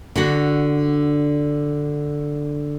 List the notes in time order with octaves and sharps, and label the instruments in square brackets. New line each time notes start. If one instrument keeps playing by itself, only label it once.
[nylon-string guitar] D3 D4 F#4